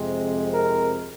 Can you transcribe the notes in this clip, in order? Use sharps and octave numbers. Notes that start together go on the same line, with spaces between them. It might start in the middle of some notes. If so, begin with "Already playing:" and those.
Already playing: F2 C3 G#3 C4
A#4